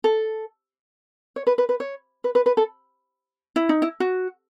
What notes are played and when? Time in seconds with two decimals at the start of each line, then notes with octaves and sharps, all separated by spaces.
0.04 A4
1.36 C#5
1.47 B4
1.58 B4
1.69 B4
1.80 C#5
2.24 B4
2.35 B4
2.46 B4
2.57 A4
3.56 E4
3.69 D#4
3.82 E4
4.00 F#4